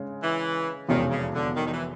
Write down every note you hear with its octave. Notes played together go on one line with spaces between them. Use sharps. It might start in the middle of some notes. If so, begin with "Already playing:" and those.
Already playing: C#3 G#3
E3
F1 E2 B2 D#3 G#3 C#4
C#3
D3
D#3
D#3
E3